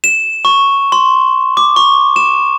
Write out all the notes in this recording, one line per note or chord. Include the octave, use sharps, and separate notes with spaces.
E7
C#6
C6
D6
C#6
E7